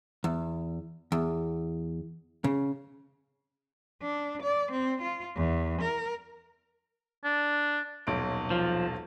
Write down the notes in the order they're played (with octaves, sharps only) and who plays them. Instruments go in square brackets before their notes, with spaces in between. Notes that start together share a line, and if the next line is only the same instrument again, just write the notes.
[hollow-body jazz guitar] E2
E2
C#3
[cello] D4
D5
C4
F4
E2
A#4
[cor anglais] D4
[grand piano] D#1 B1 D7
[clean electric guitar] F3